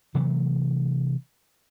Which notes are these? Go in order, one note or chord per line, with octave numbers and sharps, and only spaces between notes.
C3 E3 F#3 A3